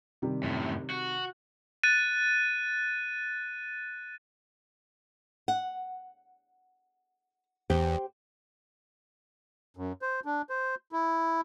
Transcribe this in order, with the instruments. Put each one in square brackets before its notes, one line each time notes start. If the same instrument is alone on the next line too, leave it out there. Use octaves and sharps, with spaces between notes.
[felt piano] C3 D#3 G3
[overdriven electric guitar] F#2 A2
F#4
[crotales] F#6 A6 D#7
[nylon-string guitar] F#5
[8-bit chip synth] E2 [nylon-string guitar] G4 C5 G5
[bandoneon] F#2
C5
D4
C5
E4